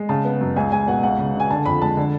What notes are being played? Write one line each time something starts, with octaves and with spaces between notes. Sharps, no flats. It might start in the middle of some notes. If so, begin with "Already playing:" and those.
Already playing: G#3
C#3 A5
B3
F#2
C#2 G#5
C#2 G#5
B2 F#5
C#2 F#5
C#3
C#3 G#5
D3 A5
F2 B5
G#3 A5
D3